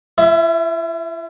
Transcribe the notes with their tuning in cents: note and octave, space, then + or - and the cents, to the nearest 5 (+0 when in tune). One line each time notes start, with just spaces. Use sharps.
E4 +45 E5 +0